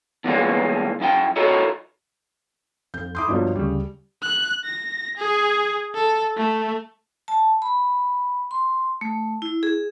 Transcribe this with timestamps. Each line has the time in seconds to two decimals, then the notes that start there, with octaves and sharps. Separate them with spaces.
0.24 B2 E3 G3 G#3 A#3 C#4
1.00 F#2 E4 G4 G5
1.36 E4 F#4 A4 A#4 C#5 D#5
2.94 F2 G6
3.15 E4 C6 D6 D#6 G6
3.28 A#1 G2 B2 F3 F#3
3.56 D2 C#3 G3
4.22 F#6
4.65 A#6
5.17 G#4
5.95 A4
6.37 A3
7.28 A5
7.62 B5
8.51 C6
9.01 A3
9.42 E4
9.63 G#4